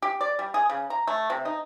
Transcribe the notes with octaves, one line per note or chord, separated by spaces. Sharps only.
G4
D5
G3
G#4
C#3
A#5
A3
C3
D#4